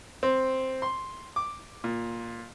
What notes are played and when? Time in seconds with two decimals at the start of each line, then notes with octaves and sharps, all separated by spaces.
0.23 C4
0.82 C6
1.36 D6
1.84 A#2